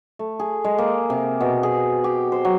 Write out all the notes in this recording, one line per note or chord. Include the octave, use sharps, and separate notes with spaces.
A3
G#4
G#3
A#3
C3
B2
G#4
G4
C5
F#3